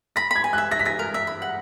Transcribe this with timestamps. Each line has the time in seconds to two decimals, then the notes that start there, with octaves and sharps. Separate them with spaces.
0.16 B5 A#6
0.31 B5 G#6
0.44 G#5
0.53 E5 F#6
0.71 E5 A#6
0.79 B6
0.85 G#5 A#6
0.99 A#4
1.14 E5
1.27 B5
1.42 F#5